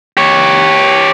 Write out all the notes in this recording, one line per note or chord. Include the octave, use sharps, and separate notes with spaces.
G4 C#5